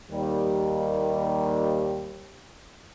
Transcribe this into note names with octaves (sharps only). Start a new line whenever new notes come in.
D#2 G3